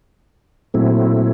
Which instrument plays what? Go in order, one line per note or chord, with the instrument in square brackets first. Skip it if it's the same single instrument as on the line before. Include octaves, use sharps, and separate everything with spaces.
[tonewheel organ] A#2 F#3 A3 C4 E4